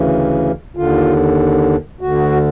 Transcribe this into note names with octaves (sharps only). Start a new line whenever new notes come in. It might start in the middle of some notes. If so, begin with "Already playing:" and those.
Already playing: D2 C#3 E3
D#2 D3 F4
D2 D3 F#4